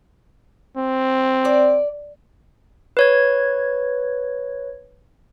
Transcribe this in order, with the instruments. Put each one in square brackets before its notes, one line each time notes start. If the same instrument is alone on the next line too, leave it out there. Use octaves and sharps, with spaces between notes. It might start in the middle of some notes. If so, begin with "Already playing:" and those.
[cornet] C4
[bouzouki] D5
[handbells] B4 C#5 G#6